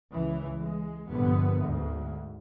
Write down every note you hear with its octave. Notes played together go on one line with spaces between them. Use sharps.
C#2 E3
G#3
A#1 G2 D3 B3
D2 G#2